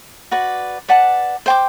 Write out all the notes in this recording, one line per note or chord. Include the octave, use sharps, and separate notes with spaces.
F#4 B4 D5
B4 D5 F#5 A5
C5 G5 D6